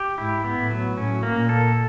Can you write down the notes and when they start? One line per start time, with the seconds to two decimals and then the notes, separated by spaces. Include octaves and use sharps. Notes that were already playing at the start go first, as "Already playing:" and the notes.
Already playing: G4
0.18 G#2 E4
0.44 B3
0.58 A2
0.71 F#3
0.97 A2 C#4
1.23 A#3
1.36 A#2
1.49 A4